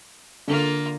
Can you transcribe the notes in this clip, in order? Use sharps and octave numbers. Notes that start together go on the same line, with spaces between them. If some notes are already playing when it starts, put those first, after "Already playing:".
D3 A#3 F4